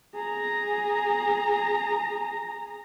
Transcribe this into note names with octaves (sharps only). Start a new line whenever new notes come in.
G#4 A#5